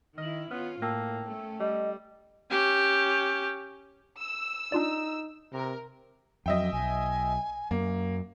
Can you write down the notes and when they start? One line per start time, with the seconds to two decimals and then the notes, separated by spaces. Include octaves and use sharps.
0.18 D#3 E4 D#5 F6 F#7
0.51 B3 C#4 F4 F6
0.82 A2 A#3 G5 A5 E6
1.26 A3 C#4
1.60 G3 D#5
2.51 C#4 G4
4.22 E6
4.72 D4 D#4 F4 D5
5.53 C3 A#4
6.46 F2 F#3 D#5 E5 G5
6.73 B1 G#5
7.71 F#2 A#3